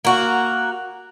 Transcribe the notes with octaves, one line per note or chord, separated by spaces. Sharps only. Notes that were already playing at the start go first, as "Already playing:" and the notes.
A#3 F#4